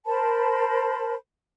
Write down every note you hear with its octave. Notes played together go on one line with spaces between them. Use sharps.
A#4 C5 A5 B5